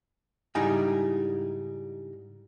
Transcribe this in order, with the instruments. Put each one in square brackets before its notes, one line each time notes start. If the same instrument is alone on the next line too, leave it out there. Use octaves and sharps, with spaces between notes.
[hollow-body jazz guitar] G#2 C#3 G3 D#4 E4 G#4